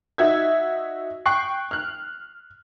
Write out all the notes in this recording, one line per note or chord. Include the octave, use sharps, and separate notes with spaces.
D#4 F#4 E5 G#6
G5 C#6 F#6 C7
F6 F#6